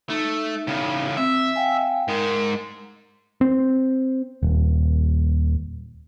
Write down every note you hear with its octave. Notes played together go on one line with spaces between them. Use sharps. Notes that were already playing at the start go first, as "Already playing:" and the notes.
A3 D#4
A2 C#3
C4 E5
F5 G5 G#5
G#2 G#3 A#4
C4
D#1